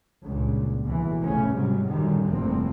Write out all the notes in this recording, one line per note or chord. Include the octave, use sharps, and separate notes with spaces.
C#2 G2 A#2
B1 E2 B2 E3
F1 A2 C#3 C#4
G#2 C3 F#3 G3
F#2 A#2 D3 D#3 G3
F1 E2 G2 F3 A#3 C4